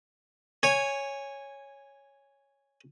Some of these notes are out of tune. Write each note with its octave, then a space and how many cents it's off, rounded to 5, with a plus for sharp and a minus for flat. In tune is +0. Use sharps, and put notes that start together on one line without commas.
C#5 +0 G#5 -10